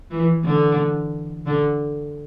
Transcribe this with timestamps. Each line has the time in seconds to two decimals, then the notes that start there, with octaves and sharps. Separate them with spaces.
0.11 E3
0.44 D3
1.46 D3